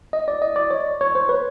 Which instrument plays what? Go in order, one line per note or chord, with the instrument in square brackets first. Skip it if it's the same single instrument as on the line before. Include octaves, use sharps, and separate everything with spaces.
[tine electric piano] D#5
D5
D#5
D5
C#5
C#5
C5
B4